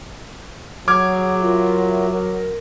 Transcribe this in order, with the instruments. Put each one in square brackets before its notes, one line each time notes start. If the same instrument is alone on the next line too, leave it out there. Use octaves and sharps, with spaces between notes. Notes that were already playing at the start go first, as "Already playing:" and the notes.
[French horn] F#3 [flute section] G#4 [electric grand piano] D6 F6 G#6
[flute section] F4 A#4 E5
A#4